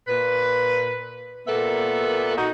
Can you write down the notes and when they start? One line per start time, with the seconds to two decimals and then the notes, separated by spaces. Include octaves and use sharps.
0.08 A#2 B4
1.48 A#2 A#3 B3 A4 E5
2.37 D#4 F#4